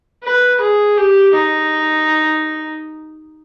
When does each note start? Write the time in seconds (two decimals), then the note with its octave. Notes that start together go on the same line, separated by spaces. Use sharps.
0.24 B4
0.61 G#4
0.97 G4
1.34 D#4